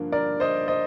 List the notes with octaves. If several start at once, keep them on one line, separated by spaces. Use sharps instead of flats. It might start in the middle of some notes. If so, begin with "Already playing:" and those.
Already playing: G2 D3 F3 A#3
A#4 D5
C5 D#5
C5 D#5